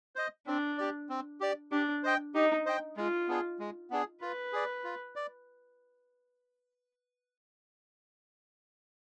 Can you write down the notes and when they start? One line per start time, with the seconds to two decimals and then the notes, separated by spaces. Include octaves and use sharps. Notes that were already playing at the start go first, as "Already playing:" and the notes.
0.16 C5 D#5
0.47 C4 D4
0.78 G4 D5
1.09 C4
1.41 G4 D5
1.72 D4 G4
2.03 C5 D#5 G5
2.34 D#4 G4
2.66 C5 D#5 G5
2.97 G#3 F4
3.28 B3 D4 G#4
3.59 G#3
3.91 B3 D4 G#4
4.21 F4 B4
4.53 G#4 D5
4.84 F4
5.16 D5